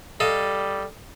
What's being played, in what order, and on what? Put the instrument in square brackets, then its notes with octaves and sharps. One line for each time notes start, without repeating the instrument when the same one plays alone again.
[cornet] G3 [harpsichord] A4 D#5 F5